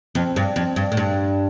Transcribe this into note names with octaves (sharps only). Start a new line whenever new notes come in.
F2
G2
F2
G2
A2
G2